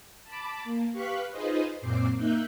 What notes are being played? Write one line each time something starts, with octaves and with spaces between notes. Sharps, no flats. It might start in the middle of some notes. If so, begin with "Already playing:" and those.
A5 B5 D6
A#3
G4 B4 F5 B5 C#6 F#6
D#4 F4 G#4 B4 C5 D#5
F#2 A#2 C4 D6 C7
A#3 D#4 E5 F#6 G6